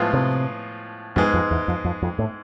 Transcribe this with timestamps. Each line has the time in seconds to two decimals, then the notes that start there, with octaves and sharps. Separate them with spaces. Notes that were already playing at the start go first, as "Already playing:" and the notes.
Already playing: A2 F3 G#3 B3 F4
0.13 C3
1.16 F2 G#2 G#3 B3
1.34 F2
1.51 E2
1.68 F2
1.85 F2
2.02 F2
2.19 A2